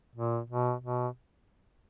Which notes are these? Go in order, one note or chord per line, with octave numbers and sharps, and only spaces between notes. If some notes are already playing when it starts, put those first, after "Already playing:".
A#2
B2
B2